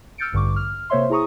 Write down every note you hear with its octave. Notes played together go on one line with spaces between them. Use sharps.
E6 F6 G6 A6 C#7 D7
A1 G2 D3 C#6 D6
F6
C3 A#3 C5 C#5 E5 C6
E4 G#4 A#5 C#6 D#6